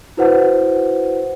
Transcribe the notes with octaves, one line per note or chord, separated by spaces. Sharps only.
E4 F#4 B4 C5 F#5